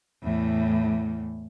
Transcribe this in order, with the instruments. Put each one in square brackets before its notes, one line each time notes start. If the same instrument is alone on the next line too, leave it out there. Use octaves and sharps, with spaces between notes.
[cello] E2 A2